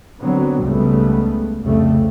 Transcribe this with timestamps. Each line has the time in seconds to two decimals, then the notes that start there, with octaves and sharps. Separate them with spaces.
0.21 D3 F#3 B3 C4
0.61 C#2 G#2 C#3 G3 A3 B3
1.62 C2 F2 C#3 G3 A3